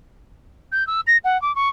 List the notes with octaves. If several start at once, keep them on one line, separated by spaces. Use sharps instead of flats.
G6
E6
A#6
F#5
D6
C#6